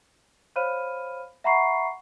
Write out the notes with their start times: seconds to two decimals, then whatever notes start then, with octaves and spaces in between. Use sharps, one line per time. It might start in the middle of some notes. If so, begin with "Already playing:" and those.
0.56 C5 C#5 F5 B5 F6 D#7
1.44 E5 F#5 A#5 B5 C#6 C7